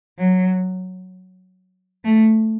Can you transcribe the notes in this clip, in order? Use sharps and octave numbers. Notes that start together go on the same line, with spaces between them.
F#3
A3